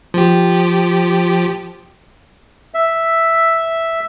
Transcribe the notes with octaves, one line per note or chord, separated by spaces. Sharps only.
F3 G4
E5